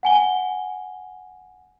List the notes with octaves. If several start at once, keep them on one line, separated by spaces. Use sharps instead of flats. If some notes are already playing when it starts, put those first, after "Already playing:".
F#5 G#5 G7